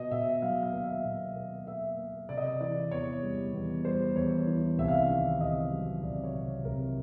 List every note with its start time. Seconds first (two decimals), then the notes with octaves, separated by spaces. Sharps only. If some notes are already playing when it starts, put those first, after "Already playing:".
Already playing: B2 D#5
0.11 B2 E5
0.42 F#3 F5
0.63 F5
0.73 A#3
0.83 E5
1.05 B2
1.36 A#3
1.67 A#3 E5
1.98 A#3
2.29 C3 D5
2.38 D#5
2.45 D5
2.61 E3 D5
2.91 E2 C#5
3.23 G3
3.54 E2
3.85 G3 C5
4.16 E2 C#5
4.47 E3
4.78 C2 E5
4.88 F5
4.98 E5
5.09 D#3
5.40 C2 D#5
5.71 F#3
6.03 C2 D5
6.24 C#5
6.34 C3
6.65 C2 A#4